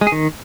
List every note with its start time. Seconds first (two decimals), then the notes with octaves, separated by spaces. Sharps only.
0.01 G#3
0.07 G#4
0.12 D#3